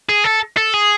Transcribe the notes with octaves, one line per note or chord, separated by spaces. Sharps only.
G#4
A4
A4
G#4